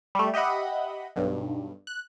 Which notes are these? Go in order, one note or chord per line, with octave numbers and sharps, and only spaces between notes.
G3 A3
G4 D#5 E5 F#5 B5
B1 G2
F#6